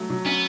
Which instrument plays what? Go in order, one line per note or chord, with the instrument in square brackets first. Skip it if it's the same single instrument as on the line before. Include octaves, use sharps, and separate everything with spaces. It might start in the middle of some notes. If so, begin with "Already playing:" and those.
Already playing: [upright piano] F#3 A3
F#3
[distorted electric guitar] B3 [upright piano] C#4